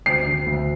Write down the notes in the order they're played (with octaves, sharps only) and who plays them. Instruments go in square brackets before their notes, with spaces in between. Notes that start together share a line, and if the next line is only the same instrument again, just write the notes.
[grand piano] D2 [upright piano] C7
[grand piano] D3
D2